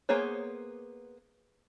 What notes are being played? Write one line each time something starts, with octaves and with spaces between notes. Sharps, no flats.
A#3 B3 G#4 C5 C#5